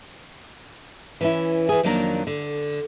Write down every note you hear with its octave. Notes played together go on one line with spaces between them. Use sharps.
E3 C#4 E4
E3 G#4
F2 D#3 F#3 A#3 D4 A#4
D3